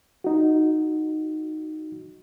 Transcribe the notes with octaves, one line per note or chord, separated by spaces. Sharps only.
D#4 F#4